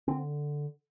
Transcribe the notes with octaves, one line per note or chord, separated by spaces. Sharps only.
D3 C4